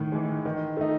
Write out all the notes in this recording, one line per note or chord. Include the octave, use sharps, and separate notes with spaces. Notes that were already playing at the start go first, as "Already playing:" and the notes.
Already playing: A2 D#3
E3 G#3
D#3
A3 D#4